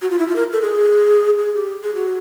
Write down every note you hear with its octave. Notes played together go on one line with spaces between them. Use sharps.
F#4
F4
E4
F4
A#4
A4
G#4
G#4
G4
G#4
F#4